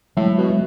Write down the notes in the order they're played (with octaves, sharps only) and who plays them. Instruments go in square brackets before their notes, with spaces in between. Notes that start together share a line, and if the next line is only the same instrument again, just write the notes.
[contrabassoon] A2 [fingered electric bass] F#3 G#3
[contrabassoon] B2
[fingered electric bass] G#3